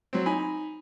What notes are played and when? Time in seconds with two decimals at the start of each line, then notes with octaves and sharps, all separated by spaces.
0.13 F#3 C4
0.26 D#4 G#5 B5